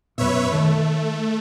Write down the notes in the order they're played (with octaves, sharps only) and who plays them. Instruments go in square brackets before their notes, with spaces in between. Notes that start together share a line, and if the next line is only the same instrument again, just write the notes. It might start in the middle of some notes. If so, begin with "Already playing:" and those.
[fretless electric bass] F#2 B2 [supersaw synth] B4 C#5 E5
[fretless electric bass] D#3 [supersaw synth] A3